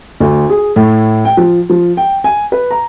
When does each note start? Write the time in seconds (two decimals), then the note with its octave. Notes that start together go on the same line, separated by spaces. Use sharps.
0.20 D2
0.50 G#4
0.76 A2
1.25 G5
1.37 F3
1.70 F3
1.97 G5
2.24 G#5
2.52 B4
2.71 A#5